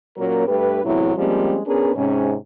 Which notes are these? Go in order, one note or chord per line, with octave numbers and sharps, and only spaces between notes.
A#2 F#3 A#3 C#4 A#4
G2 A3 G4 B4
E2 A2 C3 F#3 E4
F3 G3 G#3 A#3 C4 C#4
B3 C#4 D4 G#4 A#4 B4
G#2 C3 C#4